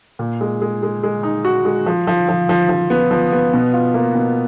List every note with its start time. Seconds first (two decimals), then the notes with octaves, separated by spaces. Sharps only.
0.19 A#2
0.41 G#3
0.62 G#3
0.83 G#3
1.03 G#3
1.23 D#4
1.45 F#4
1.65 G#3
1.86 F3
2.07 F3
2.29 F3
2.49 F3
2.69 F3
2.90 B3
3.11 F3
3.32 B3
3.54 B2
3.73 F4
3.94 A#3
4.15 B2